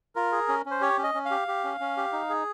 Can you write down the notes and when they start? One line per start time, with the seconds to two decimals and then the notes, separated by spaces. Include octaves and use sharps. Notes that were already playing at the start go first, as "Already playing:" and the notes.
0.16 F4 A#4
0.32 G#4
0.49 C#4
0.66 C#4
0.71 C5
0.81 G4 C#5
0.98 C#4
1.04 D#5
1.15 C#4
1.25 F5
1.31 G4
1.48 G4
1.64 C#4
1.80 C#4
1.97 G4
2.12 D#4
2.30 G#4